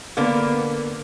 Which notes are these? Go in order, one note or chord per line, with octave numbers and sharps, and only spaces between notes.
D3 A#3 B3